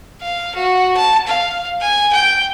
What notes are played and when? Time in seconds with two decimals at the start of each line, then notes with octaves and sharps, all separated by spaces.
0.21 F5
0.55 F#4
0.97 A5
1.27 F5
1.81 G#5
2.13 G5